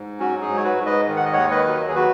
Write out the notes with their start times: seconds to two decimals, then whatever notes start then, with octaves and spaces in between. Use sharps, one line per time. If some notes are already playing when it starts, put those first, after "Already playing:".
Already playing: G#2
0.20 F#3 C#4 F#4
0.41 D#4 G#4
0.49 G#2
0.57 C#5
0.64 F#4 B4
0.78 G#2
0.86 B4 D#5
1.08 D#3
1.16 F#5
1.25 D#5
1.33 D#2 C#5 F#5
1.51 B4 D#5
1.66 F#3
1.88 G#4
1.95 F#3 F#4 B4